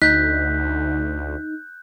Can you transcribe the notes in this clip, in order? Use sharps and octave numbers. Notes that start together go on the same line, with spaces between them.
D2 D#4 F#6 G6 B6